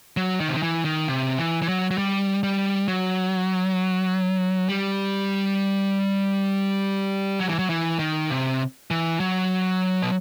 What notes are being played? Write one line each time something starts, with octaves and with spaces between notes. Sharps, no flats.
F#3
D#3
C3
D#3
E3
D#3
C3
E3
E3
F#3
F#3
G3
G3
F#3
G3
F#3
E3
F#3
E3
D#3
C3
E3
F#3
B2